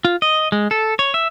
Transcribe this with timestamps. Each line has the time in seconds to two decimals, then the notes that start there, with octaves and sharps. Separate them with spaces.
0.05 F4
0.22 D#5
0.52 G#3
0.71 A4
0.99 C#5
1.14 E5